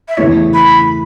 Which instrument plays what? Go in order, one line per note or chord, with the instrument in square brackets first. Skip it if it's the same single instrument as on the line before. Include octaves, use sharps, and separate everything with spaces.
[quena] E5
[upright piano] E2 C#3 E3 A3 E4 [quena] C#5
[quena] B5